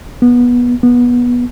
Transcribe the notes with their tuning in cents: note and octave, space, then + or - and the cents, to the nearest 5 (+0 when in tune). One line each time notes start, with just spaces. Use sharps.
B3 -20
B3 -20